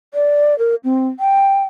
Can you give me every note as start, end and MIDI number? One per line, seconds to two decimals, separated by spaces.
0.14 0.57 74
0.58 0.75 70
0.84 1.08 60
1.19 1.65 79